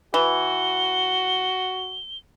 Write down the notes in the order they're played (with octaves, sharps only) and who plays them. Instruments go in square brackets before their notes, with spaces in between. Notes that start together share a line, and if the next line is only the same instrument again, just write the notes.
[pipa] E3 [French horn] F#4 [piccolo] G7